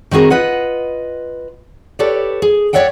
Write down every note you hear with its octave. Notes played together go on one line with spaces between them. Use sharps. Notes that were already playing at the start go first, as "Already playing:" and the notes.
D#3 C4 F#4 G#4 A#4
F4 B4 D#5 F#5
G4 A4 B4 C#5 D5
G#4
C#5 D5 E5 F#5 G5